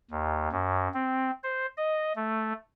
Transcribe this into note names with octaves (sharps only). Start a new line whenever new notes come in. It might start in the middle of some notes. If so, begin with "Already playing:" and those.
D#2
F#2
C4
C5
D#5
A3